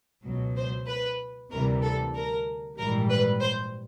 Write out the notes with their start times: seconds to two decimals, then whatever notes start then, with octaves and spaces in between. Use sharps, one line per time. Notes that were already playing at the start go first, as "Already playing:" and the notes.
0.24 C#2 B2 F#3
0.56 C5
0.88 B4
1.51 D2 C3 E3 G3 A#4
1.83 A4
2.15 A#4
2.78 A#1 G#2 E3 G3 A#4
3.10 B4
3.42 C5